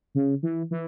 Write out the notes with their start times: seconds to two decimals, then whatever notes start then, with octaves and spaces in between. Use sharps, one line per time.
0.15 C#3
0.43 E3
0.71 E3